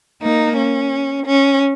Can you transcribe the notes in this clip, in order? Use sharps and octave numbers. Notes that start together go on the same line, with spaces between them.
A#3 D#4
C#4
C#4